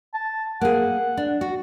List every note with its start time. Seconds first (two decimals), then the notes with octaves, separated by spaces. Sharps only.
0.14 A5
0.61 A#3 G#4 F#5
1.17 D4
1.41 F#4